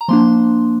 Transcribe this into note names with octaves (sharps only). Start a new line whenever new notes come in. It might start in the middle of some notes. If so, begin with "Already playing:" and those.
A#5
F3 A#3 D4 C6